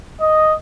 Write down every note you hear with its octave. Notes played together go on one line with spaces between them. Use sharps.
D#5